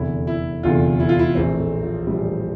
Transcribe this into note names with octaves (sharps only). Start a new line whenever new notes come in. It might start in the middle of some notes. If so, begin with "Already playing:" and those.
Already playing: F1 E2 D3 E4
E4
F1 E2 D3 F4
E4
F4
E4
A#1 A2 E3 C4
A3
F3
A#1 A2 E3 G3